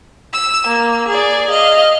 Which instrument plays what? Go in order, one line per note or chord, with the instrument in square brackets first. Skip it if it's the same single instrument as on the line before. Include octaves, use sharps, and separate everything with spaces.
[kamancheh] E6
A#3
G#4 D5
D#5 F5